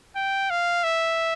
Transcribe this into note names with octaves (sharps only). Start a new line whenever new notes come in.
G5
F5
E5